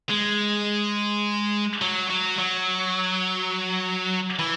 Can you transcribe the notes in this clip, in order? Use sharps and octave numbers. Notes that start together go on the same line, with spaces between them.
G#3
F#3
F#3
F#3
E3